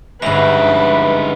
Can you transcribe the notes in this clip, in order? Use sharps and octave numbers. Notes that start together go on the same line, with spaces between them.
G1 G#2 C#3 B4 E5 A#5